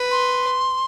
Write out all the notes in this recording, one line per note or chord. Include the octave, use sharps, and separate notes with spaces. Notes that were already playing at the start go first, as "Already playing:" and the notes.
Already playing: B4
C6